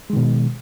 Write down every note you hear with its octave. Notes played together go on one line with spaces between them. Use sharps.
B2 D#3 G#3